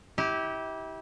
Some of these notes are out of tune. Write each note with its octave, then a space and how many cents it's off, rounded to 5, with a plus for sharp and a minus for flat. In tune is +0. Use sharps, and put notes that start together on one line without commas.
E4 -35 G4 -10